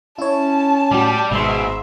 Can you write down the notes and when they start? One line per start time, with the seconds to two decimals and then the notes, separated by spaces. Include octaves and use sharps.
0.18 C#4 E4 C#5 A5
0.91 A2 G3 F#4 G4
1.31 G#1 G#2 B2 E5 C6